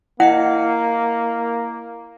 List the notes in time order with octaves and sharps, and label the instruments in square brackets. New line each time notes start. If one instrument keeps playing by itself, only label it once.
[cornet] A#3 [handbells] E4 D#5 C#7 [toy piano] F#5